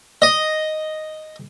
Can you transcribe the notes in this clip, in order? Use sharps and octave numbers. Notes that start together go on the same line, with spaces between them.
D#5